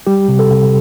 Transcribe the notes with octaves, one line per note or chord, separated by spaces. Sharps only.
G3 G4
C3
A4
C3